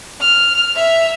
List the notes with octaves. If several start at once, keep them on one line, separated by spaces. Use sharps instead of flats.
F6
E5